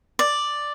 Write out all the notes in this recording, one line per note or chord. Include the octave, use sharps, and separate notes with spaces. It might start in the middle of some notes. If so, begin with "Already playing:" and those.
D5